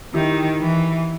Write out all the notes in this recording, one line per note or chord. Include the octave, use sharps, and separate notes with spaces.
D#3 E4 G4
E3